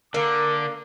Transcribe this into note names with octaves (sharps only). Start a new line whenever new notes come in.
D3 A#3 A#4 D6